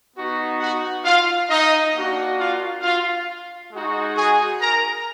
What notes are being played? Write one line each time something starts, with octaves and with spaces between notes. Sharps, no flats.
B3 D#4 F#4
F#4 F#5
F4 F5
D#4 D#5
A#3 D4 F#4
F4 F5
F4 F5
G#3 D#4 F#4
G#4 G#5
A#4 A#5